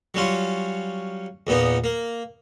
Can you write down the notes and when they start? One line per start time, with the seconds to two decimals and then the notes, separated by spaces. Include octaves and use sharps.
0.14 F#3 G3 C#4 F4
1.47 E2 A#2 B3 D#4
1.84 A#3